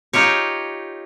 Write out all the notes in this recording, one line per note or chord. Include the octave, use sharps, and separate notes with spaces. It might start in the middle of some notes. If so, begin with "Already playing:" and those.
D#4 F4 G4 C#5